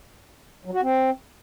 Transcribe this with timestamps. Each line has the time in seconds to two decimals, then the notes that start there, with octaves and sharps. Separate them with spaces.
0.65 F#3
0.73 F#4
0.81 C4